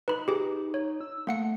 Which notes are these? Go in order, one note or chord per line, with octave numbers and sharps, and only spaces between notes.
D#4 B4 B5
G4 G#4
C#5
E6
A3 A#3 F#5 C#7